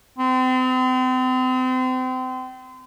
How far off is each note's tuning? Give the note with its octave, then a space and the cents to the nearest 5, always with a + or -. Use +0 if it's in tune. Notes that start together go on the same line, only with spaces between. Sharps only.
C4 -35